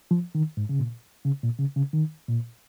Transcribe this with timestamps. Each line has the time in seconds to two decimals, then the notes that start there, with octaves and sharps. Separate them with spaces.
0.11 F3
0.35 D#3
0.57 G#2
0.69 C#3
0.80 A#2
1.25 C#3
1.43 A#2
1.59 C#3
1.76 C#3
1.93 D#3
2.29 A#2